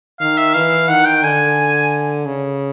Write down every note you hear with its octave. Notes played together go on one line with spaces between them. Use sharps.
D#3 F5
E5
E3 F5
D#3 F#5
G5
D3 G#5
C#3